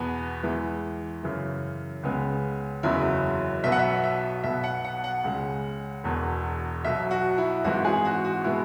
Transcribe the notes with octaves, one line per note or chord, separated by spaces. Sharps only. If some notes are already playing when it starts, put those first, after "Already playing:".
Already playing: E2 B2 B3
E2 E3 G#3
F#2 C#3 E3
C#2 C#3 G#3 B3
F#1 E2 C#3 F#3 E4
B1 B2 F#3 B3 E5
F#5
E5
E5
B1 B2 B3 E5
F#5
F#5
F#5
C#2 C#3 G#3
E1 E2 B2
B1 B2 F#3 E5
F#4
E4
G#1 G#2 E3 F#4
G#4
F#4
F#4
B2 G#3 B3 E4